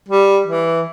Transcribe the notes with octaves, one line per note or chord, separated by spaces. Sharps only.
G3
E3